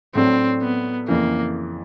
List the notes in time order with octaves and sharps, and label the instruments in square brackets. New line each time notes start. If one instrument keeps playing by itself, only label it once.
[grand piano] A2 F#3 A3 D4 [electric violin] C4
[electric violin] B3
[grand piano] F2 C#3 E3 [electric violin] A#3